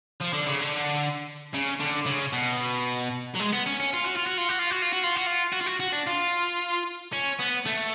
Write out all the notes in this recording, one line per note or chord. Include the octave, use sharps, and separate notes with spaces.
F3
D3
C#3
D3
C#3
D3
C#3
B2
F#3
G#3
B3
C#4
C#4
F4
F#4
F4
F#4
F4
F#4
F4
F#4
F4
F#4
F4
F#4
F4
F#4
F4
F#4
F#4
D4
F4
C#4
B3
A3